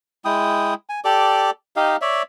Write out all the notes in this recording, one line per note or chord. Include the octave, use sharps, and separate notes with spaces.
G#3 E4 G5 D#6
G#5
G4 A4 D5 D6
D#4 G4 D#5 F5
C#5 D5 E5